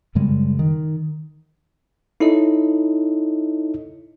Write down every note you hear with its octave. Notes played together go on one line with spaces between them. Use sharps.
F#2 C#3 G3 G#3
D#3
D#4 E4 A4 C#5 D#5